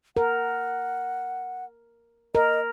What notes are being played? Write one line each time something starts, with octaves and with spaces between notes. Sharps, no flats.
A#4 F#5
A#4 D#5